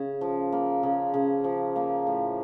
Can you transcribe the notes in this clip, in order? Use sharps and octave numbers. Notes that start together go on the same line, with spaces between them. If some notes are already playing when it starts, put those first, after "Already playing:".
Already playing: C#3
F3
A#3
C#3
C#3
F3
A#3
A2